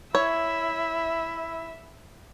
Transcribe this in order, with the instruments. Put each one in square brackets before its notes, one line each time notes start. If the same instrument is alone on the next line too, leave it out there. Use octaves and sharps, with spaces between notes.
[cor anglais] E4 [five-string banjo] C#5 [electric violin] E5